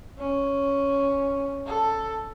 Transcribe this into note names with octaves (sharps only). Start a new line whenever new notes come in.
C#4
A4